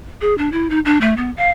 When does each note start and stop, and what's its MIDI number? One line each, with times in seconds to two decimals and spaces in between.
0.21 0.34 68
0.38 0.49 62
0.52 0.68 64
0.70 0.79 63
0.85 1.00 62
1.01 1.14 57
1.17 1.31 59
1.37 1.50 77